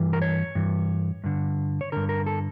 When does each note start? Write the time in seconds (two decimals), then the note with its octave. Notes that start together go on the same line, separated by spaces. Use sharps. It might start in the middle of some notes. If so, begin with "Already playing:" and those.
Already playing: G2 E3
0.13 A#4
0.22 C#5
0.55 G2 E3
1.24 G2 D3
1.81 C#5
1.92 G2 D3 A#4
2.09 A#4
2.27 A4